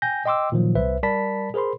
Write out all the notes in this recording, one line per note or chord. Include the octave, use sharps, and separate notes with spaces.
G5 G#5 G6 A#6
D#5 G5 C6 D6 E6
A#2 D#3 F3 F#3
C2 B4 C5 E5
G3 A#4 D5 A5 B5 B6
G#4 A#4 C5 B5 C6